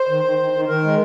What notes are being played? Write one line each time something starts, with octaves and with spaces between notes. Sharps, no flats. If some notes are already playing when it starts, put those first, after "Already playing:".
Already playing: C5
D#3
D#3
D#3
D#3
D#3 A#4
G#3